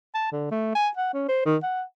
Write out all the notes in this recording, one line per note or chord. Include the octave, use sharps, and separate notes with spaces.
A5
D3
A3
G#5
F#5
C#4
C5
D#3
F#5